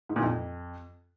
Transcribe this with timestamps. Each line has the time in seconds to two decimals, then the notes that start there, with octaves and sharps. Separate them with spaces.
0.09 G#2
0.16 A#2
0.23 F2